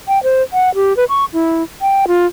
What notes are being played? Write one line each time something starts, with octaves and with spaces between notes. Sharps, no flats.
G5
C5
F#5
G4
B4
C#6
E4
G5
F4